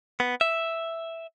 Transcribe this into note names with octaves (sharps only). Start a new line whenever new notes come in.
B3
E5